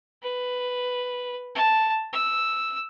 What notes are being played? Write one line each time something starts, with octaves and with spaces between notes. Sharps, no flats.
B4
A5
E6